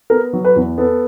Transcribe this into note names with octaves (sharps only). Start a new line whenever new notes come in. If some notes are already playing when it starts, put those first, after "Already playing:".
B3 A#4
F#3
B4
E2
B3 A4